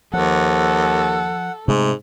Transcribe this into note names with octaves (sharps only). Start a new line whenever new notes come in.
D#2 F3 A4 F#5
G#2 C3 G#3 A3